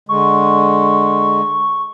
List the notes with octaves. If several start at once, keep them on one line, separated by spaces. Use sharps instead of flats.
D3 G#3 C#6